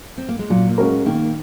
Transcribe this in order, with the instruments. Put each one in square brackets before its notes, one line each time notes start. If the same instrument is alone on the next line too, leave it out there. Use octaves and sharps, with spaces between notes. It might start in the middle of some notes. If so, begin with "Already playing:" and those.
[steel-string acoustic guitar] C4
A#3
G#3
[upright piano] A#2 [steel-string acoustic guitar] F#3
[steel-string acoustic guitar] A#3
[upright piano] G#3 C#4 F#4 A#4
[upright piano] D#3 [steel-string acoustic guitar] A#3